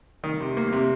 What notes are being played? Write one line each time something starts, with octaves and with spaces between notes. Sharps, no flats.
D#3
C3
A#3
C3